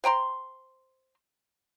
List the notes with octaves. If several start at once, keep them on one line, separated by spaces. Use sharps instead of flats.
C5 G5 A#5 C6